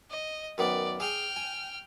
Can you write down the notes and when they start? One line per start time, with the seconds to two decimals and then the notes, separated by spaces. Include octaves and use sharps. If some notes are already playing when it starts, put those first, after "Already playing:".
0.10 D#5
0.58 F#2 D#3 B3 D5
1.00 G#4 G5 G#5 F6
1.36 G#5